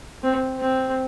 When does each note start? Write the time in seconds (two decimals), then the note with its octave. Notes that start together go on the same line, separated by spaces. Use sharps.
0.23 C4
0.60 C4